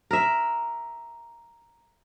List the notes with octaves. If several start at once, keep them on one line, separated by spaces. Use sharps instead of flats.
A#4 E5